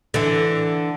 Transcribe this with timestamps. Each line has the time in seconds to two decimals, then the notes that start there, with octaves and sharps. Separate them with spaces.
0.14 D3 E3